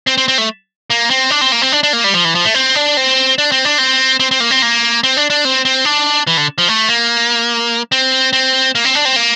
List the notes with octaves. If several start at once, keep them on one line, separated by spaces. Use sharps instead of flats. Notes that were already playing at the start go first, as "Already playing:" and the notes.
C4
C4
C4
A3
A#3
C4
D4
C4
A#3
C4
D4
D4
A#3
G3
F3
E3
F3
A3
C4
D4
C4
D4
C4
D4
C4
C4
C4
A#3
C4
A#3
C4
D4
D4
C4
C4
D4
E3
D3
F3
A3
A#3
C4
C4
A#3
C4
D4
C4
A#3